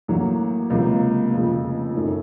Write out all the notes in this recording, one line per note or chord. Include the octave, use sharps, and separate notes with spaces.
A1 A2 F#3 A#3
C#2 C3 F#3 A#3
F1 F2 C#3
F#2 D#3 A3